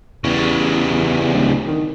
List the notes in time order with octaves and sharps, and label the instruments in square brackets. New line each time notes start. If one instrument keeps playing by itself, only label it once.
[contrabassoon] E2 [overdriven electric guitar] C#3 G3
[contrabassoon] D1
D#3